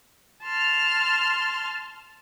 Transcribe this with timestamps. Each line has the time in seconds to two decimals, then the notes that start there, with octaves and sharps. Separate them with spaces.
0.44 A5 C6 F6